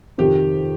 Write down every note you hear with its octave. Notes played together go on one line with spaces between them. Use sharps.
F2 C3 D#3 G4